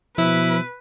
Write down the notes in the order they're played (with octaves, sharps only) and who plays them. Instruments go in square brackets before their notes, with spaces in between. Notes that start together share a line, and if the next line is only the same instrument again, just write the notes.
[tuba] B2 [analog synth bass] F3 [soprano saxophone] E4 [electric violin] B4